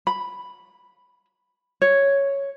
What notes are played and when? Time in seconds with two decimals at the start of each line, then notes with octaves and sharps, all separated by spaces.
0.07 B5
1.82 C#5